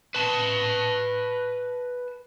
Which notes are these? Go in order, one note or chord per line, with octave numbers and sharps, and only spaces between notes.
B4 A5